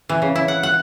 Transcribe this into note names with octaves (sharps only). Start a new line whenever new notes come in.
E3
C#3
E4
F#5
F#5